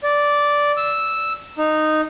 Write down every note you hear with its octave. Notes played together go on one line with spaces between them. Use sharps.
D5
E6
D#4